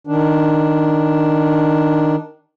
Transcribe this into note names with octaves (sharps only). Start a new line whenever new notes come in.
D#3 D4